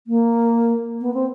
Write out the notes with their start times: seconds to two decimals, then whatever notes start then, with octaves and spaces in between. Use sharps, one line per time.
0.07 A#3
1.01 B3
1.14 C4